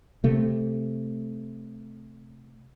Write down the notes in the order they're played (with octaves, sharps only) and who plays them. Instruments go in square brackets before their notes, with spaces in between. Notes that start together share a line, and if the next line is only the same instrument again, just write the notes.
[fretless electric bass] C3 A3